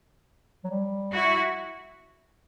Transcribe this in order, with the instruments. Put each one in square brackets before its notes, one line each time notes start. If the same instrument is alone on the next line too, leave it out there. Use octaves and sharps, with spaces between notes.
[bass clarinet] F#3
G3
[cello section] E4 F#4